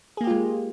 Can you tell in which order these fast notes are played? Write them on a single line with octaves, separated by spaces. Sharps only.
G#4 A#3 G4 F4 G#3